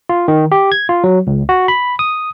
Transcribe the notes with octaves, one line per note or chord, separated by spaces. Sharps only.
F4
D#3
G4
G#6
F4
F#3
C#2
F#4
B5
D#6